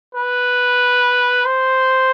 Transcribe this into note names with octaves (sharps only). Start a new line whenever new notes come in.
B4
C5